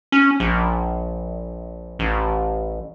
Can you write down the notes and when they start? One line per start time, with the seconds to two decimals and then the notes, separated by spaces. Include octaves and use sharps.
0.12 C#4
0.40 A#1
1.99 A1